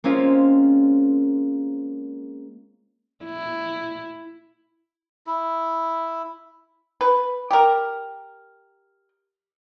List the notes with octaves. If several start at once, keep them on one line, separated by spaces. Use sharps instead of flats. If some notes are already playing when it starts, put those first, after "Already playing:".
G#3 A#3 C4 C#4 F4
E4
E4
B4
G4 A#4